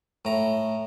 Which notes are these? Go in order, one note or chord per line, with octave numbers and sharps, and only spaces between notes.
A2 A#5